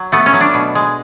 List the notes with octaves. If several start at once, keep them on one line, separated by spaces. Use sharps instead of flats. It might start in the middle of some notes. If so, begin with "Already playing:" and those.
Already playing: F#3
A3 B3
C#4
F#3
D4
B2
G#3